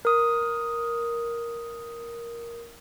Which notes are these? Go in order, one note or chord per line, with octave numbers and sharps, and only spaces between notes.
A#4 D#6